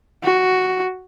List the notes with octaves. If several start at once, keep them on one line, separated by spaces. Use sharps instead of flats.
F#4